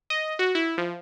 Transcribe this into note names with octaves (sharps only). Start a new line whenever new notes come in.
D#5
F#4
E4
F3